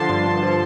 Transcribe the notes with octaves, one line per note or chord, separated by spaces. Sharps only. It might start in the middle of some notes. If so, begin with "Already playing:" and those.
Already playing: D3 F3 A5 C6
G2
G2
F3